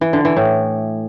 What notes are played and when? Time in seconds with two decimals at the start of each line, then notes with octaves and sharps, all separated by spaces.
0.01 E3
0.13 D3
0.25 E3
0.37 A2